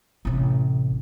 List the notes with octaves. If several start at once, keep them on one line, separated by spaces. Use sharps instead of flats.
A1 C3